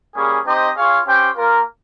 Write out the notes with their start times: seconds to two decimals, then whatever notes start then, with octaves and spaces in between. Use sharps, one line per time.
0.15 G3 A#3 C#4 G#4
0.45 C4 D#4 G4 C5 D#5
0.76 F4 G#4 C#5 F5
1.05 C#4 G4 C5 G5
1.36 A#3 F4 A#4